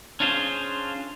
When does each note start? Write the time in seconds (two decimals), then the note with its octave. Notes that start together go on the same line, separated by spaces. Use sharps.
0.20 C#4 D4 F4 G#4 C5